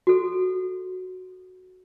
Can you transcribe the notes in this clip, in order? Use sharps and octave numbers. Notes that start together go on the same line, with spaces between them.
F#4 A4